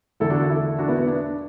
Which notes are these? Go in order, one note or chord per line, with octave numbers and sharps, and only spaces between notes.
E2 D3 A3 E4 A4
D4 F#4
E4 A4
D4 F#4
B3 E4
B3
D4